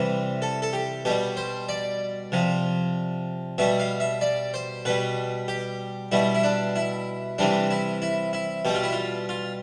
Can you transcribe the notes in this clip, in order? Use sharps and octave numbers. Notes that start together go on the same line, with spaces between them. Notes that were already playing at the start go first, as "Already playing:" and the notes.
Already playing: C3 E3 G3
A4
A4
G4
B2 G3 G4
C5
D5
C3 F3
B2 G3 E5
F5
E5
D5
C5
B2 G3 B4
G4
B2 G3 E4
E4
D4
E4
C3 E3 G3 D4
E4
E4
E4
B2 G3 G4
F4
E4
F4
F4